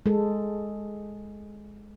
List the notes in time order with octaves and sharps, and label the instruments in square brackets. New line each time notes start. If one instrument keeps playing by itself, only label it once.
[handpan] G#3 A4